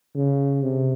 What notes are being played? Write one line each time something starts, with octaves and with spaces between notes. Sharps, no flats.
C#3
C3